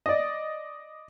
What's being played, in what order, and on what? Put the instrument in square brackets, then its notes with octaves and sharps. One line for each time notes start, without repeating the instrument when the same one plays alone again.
[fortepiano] D5 D#5